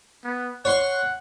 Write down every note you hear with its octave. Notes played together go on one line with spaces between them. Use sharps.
B3
C#5 F#5 C6 C#6